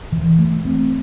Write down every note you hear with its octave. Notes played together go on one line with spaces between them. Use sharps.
E3
A3
C4